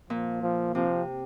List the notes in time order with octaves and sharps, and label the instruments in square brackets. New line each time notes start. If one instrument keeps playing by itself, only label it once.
[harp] A#2 [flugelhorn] F3
[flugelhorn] F3
[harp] C3 [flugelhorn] F3